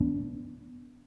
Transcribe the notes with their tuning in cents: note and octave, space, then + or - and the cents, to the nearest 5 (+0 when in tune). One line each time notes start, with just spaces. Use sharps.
B3 +0 D4 -35